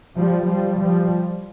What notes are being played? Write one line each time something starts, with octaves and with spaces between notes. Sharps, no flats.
F3 G3
F3 G3
F3 G3